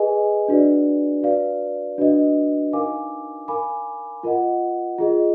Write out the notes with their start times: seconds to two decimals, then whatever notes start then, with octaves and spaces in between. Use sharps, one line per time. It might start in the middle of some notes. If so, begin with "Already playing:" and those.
Already playing: G#4 B4 D#5 G#5
0.48 D4 F#4 B4 D5
1.23 F#4 B4 D5 F5
1.98 D4 F#4 B4 D#5
2.73 D#4 A#4 F5 G#5 D6
3.48 A#4 F5 G#5 B5 D6
4.23 F4 A#4 D#5 F#5
4.98 F4 G#4 D#5